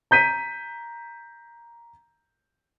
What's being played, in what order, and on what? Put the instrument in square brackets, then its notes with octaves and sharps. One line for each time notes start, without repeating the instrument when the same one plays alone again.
[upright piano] A#5 G6 B6 D#7